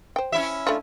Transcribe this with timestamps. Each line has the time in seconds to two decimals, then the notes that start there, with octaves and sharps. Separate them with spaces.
0.16 C5 G5
0.32 C#4 E4 E5
0.67 A3 D4 F4